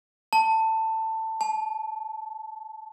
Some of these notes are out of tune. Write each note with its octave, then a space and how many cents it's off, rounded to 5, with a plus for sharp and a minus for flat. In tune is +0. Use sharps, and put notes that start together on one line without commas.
A5 +15
A5 -30